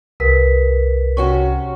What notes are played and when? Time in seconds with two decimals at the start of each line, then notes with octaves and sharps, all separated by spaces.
0.20 C2 A#4 B4 B6
1.17 C3 C#4 F#4 C#6